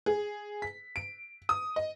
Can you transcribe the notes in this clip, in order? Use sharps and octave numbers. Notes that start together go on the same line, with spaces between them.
G#4
B6
D7
D#6
D#5